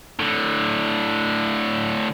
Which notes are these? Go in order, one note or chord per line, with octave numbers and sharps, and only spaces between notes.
A2 D3